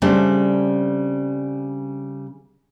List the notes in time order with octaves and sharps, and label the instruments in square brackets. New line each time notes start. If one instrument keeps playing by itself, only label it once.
[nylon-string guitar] C#3 G3 A3 C4 D4